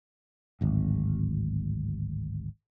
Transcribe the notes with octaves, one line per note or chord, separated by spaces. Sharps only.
D1 G#1